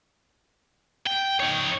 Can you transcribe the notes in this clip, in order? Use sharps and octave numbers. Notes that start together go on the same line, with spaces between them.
G5
D#4 C#5